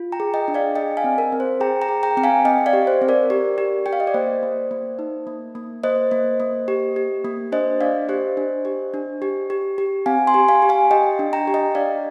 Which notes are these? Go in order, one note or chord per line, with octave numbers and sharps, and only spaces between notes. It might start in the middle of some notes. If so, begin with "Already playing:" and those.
Already playing: F4
G5 A#5
G#4
D#5 G5
D4
D5 F5
G#4 D#5 G5
F5 G#5
C4
A#4
C4
C5
G#4 G5 A#5
G5 A#5
G#4
G5 A#5
C4 G5
F5 G#5
C4 D#5 G5
D5 F5
G4
C5
C4
A#4 D5
G4
G4
G4 G5
F5
D#5
D5
A#3 C5
A#3
A#3
D#4
A#3
A#3
A#3 C5 D#5
A#3
A#3
G4
G4
A#3
D4 C5 D#5
D4 D5 F5
G4 C5 D#5
D4
G4
D4
G4
G4
G4
C4 F5 G#5
G#5 C6
G4
F5 G#5
G4
F5 G#5
G4 D#5 G5
D4
G5 A#5
G4
D#5 G5
D4 D5 F5